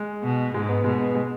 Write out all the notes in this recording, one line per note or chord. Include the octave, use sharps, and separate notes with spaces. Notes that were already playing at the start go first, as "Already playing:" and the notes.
Already playing: G#3
B2
G#2 G#3
B3
B2 G#3
B3
G#3